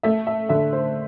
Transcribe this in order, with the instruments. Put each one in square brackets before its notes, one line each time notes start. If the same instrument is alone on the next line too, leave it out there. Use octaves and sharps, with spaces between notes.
[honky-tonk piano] A3 E5
E5
D3 E5
C5